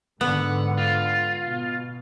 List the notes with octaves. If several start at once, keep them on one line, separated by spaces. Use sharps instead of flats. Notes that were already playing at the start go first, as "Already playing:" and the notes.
G#2 D3 B3 F#5
F4
B2